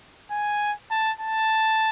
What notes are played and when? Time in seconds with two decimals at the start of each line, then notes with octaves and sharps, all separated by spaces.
0.31 G#5
0.91 A5
1.21 A5